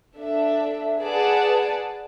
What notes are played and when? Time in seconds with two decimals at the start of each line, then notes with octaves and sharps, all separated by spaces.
0.16 D4 A4 E5
1.00 G#4 B4 D5 F#5 A5